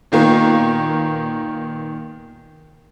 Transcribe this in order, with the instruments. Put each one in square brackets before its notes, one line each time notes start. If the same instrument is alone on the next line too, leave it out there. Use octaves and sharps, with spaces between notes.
[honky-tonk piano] A#2 D#3 A#3 B3